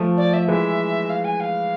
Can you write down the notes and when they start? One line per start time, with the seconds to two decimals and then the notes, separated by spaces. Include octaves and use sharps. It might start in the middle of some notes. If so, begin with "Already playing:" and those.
Already playing: F3 A3
0.17 D5
0.33 E5
0.48 E3 G#3 E5
1.10 F5
1.25 G#5
1.40 F5